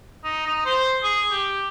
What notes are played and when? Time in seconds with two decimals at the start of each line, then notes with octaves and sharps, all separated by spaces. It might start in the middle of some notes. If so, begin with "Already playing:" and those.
0.24 D#4
0.46 D#4
0.65 C5
1.03 G#4
1.31 G4